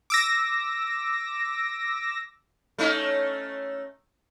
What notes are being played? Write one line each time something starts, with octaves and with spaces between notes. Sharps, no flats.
D6 E6 A#6
A3 C#4 D#4